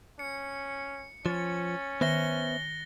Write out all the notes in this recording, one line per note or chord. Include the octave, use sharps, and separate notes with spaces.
C#4 C#7
F3 C#4 A6
D#3 B3 C5 E5 F#6 A#6 G7